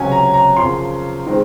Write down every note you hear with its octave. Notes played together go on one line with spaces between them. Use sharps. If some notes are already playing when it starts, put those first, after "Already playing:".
Already playing: C#2 C3 F#3 C#4 G#5
A#5
A#5
F#2 C#3 F3 C6
D#3 G#3 C4